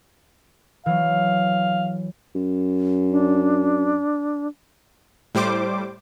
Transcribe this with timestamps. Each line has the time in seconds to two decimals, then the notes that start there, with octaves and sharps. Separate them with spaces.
0.86 E3 F#3 F5
2.35 F#2
3.10 D4
5.35 A2 G3 C5 D6